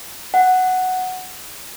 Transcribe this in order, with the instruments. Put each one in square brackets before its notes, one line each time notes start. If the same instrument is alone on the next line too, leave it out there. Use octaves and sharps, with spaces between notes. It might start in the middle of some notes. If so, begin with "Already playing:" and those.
[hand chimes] F#5